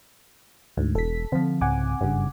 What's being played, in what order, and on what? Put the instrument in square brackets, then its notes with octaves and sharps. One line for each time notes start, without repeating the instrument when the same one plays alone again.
[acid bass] D2 [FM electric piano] G#2
[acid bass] E1 [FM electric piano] A4 B6
[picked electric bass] D3 F3 [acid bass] C4
[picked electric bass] C2 G#2 C#3 [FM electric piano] F#5 G#5 D6
[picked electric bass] F#1 A#2 C#3 [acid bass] G2